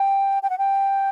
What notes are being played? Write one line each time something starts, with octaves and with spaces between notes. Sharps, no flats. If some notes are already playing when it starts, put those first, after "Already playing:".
Already playing: G5
G5
F#5
G5